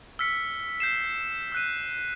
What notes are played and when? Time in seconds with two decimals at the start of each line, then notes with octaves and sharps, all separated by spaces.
0.19 E6 F6 B6 C#7
0.80 G6 C7 E7
1.52 E6 F#6 D#7